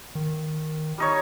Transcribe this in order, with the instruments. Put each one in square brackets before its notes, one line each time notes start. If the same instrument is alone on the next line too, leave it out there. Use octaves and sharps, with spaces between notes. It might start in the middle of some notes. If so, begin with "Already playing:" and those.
[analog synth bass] D#3
[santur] G3 D#4 C#5